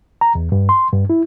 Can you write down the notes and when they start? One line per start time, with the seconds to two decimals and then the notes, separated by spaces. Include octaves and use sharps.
0.21 A#5
0.35 E2
0.52 G2
0.69 C6
0.93 G2
1.10 E4